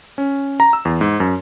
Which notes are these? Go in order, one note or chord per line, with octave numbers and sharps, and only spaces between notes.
C#4
A#5
E6
E2
G#2
F#2